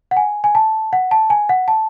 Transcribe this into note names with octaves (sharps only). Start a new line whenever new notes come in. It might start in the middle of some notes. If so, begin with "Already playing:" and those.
F#5
G#5
G#5
A5
F#5
A5
G#5
F#5
A5